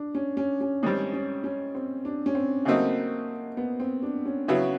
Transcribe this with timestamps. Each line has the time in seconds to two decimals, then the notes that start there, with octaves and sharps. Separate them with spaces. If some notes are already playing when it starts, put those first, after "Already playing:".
Already playing: D4
0.15 C#4
0.37 C#4
0.61 C#4
0.83 G#2 D#3 G3 C4 C#4
1.13 C#4
1.44 C#4
1.75 C4
2.05 D4
2.26 C#4
2.35 C4
2.65 C#3 F#3 A3 A#3 C4 D#4
3.57 B3
3.80 C4
4.02 D4
4.25 C#4
4.48 C#3 F#3 B3 C#4 E4